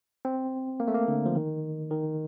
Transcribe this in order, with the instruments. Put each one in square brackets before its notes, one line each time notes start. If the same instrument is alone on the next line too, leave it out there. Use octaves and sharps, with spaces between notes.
[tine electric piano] C4
A#3
A3
A#3
D3
F3
D#3
D#3